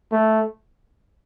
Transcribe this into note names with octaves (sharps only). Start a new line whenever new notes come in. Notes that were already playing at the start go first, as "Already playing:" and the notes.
A3